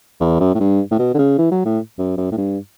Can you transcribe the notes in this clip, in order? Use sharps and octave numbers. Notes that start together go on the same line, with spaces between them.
E2
F#2
A2
G2
A2
B2
D3
C#3
E3
F#3
A2
F#2
F#2
A2
G2